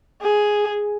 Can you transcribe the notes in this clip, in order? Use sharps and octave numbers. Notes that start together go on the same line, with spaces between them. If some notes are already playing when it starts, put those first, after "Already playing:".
G#4